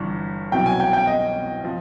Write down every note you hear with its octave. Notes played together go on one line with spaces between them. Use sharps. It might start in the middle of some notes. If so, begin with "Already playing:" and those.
Already playing: G1 G2 E3
C2 B2 F#3 G5
G#5
G5
G5
D#5
F3